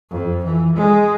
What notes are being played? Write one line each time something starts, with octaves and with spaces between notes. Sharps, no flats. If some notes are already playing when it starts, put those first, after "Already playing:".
F2
E3
G#3